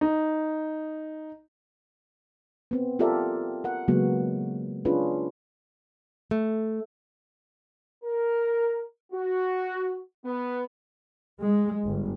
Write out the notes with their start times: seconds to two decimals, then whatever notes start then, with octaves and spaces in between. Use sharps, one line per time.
0.01 D#4
2.71 B3 C4
2.99 F4 G4 A4 A#4 D5 E5
3.64 A#4 F#5
3.88 C#3 F#3 G#3 A#3 B3 F#4
4.85 C#4 D4 F4 G#4 B4
6.31 A3
8.04 A#4
9.13 F#4
10.25 B3
11.41 G#3
11.85 G1